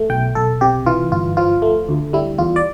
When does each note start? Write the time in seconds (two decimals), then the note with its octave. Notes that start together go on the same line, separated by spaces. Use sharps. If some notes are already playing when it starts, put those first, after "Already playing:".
Already playing: A3
0.10 B1 G5
0.35 B1 A4
0.61 C3 G4
0.86 E3 F4
1.12 G1 F4
1.37 F3 F4
1.62 A3
1.88 D2
2.13 G3 E4
2.38 E2 F4
2.56 D5